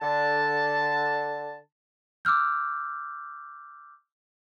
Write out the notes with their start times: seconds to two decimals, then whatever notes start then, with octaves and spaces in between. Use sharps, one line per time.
0.02 D3 A5
2.25 D6 E6 F6 G6